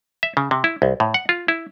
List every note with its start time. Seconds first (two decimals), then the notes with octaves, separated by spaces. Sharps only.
0.23 E5
0.37 C#3
0.51 C3
0.64 E4
0.82 C2
1.00 A2
1.14 F#5
1.29 F4
1.48 E4